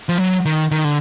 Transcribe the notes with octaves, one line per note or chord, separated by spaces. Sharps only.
F3
F#3
D#3
D#3
D3